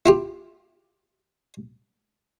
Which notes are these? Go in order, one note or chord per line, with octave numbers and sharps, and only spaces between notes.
E4 F4 G4